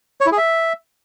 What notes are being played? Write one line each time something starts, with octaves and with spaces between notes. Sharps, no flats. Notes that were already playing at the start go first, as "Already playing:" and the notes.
C#5
E4
G#4
E5